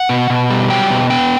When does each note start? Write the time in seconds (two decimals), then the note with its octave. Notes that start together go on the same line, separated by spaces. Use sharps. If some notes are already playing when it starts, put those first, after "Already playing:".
Already playing: F#5
0.09 B2
0.30 B2
0.50 G3
0.70 F#3 G5
0.90 B2
1.10 B3 G5